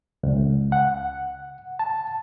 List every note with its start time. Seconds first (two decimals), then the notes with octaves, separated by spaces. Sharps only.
0.23 C#2
0.72 F#5
1.79 A5